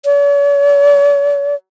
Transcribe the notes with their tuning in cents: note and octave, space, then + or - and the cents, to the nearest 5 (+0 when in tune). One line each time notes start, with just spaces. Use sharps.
C#5 +45